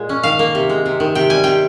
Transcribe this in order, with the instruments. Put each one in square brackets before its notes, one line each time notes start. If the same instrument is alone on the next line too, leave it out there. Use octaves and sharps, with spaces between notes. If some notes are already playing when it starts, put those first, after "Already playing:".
Already playing: [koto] A#2 G#3
C#4
D#3 F5
A#3
C3
G#3
C3
D#3
C3 G5
G3 G#5
C3 G5